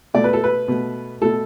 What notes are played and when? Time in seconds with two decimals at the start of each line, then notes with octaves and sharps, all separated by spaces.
0.14 B2 A3 D5
0.24 B4
0.33 A4
0.44 B4
0.68 B2 A3
1.21 B2 A3 A4